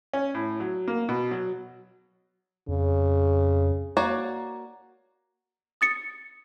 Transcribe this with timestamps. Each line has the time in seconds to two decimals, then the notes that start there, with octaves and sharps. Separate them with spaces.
0.13 C#4
0.34 A2
0.60 F#3
0.88 A#3
1.09 B2
1.31 F#3
2.68 F2 C#3
3.97 A#3 F#4 C#5 D5
5.81 D#6 A6 C#7